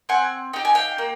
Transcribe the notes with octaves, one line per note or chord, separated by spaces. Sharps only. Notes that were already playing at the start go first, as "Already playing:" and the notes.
C4 F#5 G#5
D#4 G4 G5
G#5
F5 G5
A#3